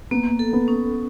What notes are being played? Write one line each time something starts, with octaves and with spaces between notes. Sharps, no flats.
A#3 B3
A4
B3
C#4